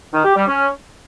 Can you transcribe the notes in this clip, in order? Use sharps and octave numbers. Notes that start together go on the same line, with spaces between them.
D#3
G4
G3
C#4